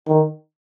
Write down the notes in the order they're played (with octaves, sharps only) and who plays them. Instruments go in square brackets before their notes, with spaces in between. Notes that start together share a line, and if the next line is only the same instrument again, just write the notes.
[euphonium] D#3